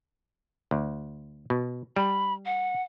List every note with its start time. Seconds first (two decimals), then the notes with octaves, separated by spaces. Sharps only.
0.71 D2
1.50 B2
1.96 G3 B5
2.45 F#5